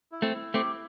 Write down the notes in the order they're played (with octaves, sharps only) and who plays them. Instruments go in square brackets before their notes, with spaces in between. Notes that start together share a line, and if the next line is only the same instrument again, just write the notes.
[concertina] E4
[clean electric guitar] A3 C4
[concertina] E4
[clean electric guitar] A3 C4 [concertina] G4